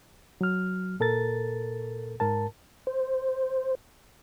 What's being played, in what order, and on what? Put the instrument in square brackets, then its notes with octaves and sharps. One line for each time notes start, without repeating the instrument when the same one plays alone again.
[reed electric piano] F#3 F6
A#2 A4 A#4 A6
G#2 A#4 A5
[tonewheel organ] C5